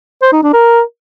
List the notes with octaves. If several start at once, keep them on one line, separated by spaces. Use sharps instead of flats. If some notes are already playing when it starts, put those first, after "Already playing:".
C5
D#4
D4
A#4